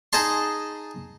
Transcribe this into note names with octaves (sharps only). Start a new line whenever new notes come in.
D#4 G#4 D#5 A5 C6